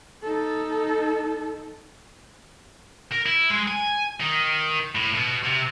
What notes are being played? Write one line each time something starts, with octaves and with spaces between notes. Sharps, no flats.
D#4 A4
A#4
E4
G#3
G#5
D#3
A2
B2
C3